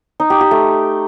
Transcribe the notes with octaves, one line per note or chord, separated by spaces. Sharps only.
D#4
G4
G4
A3